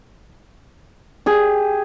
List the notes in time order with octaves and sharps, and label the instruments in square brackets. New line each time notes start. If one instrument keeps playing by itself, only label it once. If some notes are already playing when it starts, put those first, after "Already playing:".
[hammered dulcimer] G4 G#4